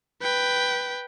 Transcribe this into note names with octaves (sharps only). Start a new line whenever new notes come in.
B4 G5